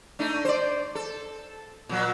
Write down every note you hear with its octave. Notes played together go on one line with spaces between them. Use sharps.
A3 D4 D#4
C5 D5
A4
A#2 F#3